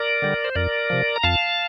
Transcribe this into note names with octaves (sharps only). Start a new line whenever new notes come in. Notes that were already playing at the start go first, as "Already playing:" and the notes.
Already playing: A#4 D5
D3 G3
C5
F2 A#4 D5
C3 F3
A#5
F2 F5 A5